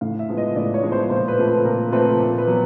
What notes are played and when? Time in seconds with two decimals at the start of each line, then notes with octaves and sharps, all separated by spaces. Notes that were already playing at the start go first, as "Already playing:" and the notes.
0.01 A2 F5
0.19 E5
0.28 F3 G#3 B3
0.38 D#5
0.56 A2 D5
0.74 C#5
0.83 F3 G#3 B3
0.92 C5
1.10 A#2 C5
1.28 B4
1.38 F3 A3 C4
1.47 B4
1.65 A#2 A#4
1.92 F3 A3 C4 B4
2.20 A#2
2.38 B4
2.47 F#3 B3